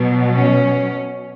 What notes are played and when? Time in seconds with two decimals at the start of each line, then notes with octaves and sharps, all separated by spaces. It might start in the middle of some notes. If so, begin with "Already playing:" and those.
Already playing: B2 F#3
0.39 C#4